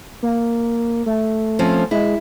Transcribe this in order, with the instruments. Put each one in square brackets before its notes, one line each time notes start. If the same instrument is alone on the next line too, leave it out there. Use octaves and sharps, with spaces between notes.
[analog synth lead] A#3
A3
[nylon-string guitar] F3 C4 C#4
[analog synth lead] G#3 [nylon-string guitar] E4